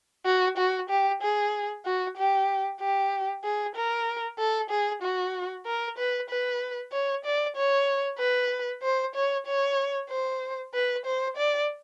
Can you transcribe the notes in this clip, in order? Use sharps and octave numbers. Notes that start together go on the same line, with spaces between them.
F#4
F#4
G4
G#4
F#4
G4
G4
G#4
A#4
A4
G#4
F#4
A#4
B4
B4
C#5
D5
C#5
B4
C5
C#5
C#5
C5
B4
C5
D5